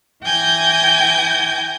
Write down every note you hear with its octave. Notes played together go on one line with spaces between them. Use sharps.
E3 G5 G#5 G6 A#6